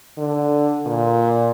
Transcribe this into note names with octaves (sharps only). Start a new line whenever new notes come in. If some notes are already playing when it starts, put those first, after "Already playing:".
D3
A#2